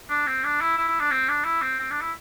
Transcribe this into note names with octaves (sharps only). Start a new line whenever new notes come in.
D4
C4
D4
E4
E4
E4
D4
C4
D4
E4
C4
C4
D4
E4